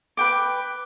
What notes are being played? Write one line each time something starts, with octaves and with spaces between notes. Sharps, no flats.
B4 G5 D6